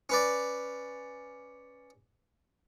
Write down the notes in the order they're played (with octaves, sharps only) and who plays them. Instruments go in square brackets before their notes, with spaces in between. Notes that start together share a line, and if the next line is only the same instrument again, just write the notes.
[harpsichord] C#4 B4 D5